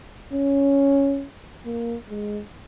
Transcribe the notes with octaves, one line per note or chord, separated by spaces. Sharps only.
C#4
A#3
G#3